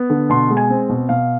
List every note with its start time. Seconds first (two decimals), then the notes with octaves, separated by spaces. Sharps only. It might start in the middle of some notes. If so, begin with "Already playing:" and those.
Already playing: B3
0.10 D3
0.29 B2 C6
0.50 G#3
0.57 G#5
0.70 C4
0.89 B2
1.09 B2 F5